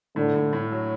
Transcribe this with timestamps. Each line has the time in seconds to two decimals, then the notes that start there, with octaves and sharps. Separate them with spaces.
0.16 A2 D3
0.35 A2
0.53 A2
0.72 F#3